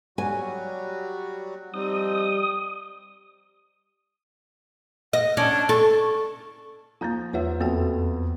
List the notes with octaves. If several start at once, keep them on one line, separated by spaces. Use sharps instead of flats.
F#3 G3 F#4 G#5
F3 G3 C4 D#4 D#6
D#5 F#5
C#4 D4 A5
A4 C#6
F3 A#3 F4 A#5 G6
E2 F3 F4 B4 C#5 E5 F#5
F2 A#3 B3 F#4 G5